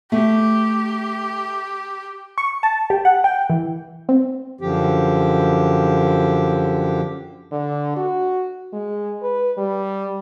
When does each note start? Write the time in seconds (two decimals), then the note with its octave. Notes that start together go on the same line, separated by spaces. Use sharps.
0.12 A3 G4
2.38 C#6
2.63 A5
2.90 G4
3.05 F#5
3.24 G5
3.50 E3
4.09 C4
4.61 F#2 D3 F3 G4
7.52 D3
7.97 F#4
8.73 G#3
9.22 B4
9.57 G3